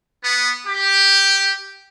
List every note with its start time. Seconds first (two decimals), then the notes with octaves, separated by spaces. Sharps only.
0.22 B3
0.67 G4